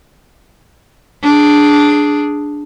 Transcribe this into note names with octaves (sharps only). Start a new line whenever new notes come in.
D4 G#4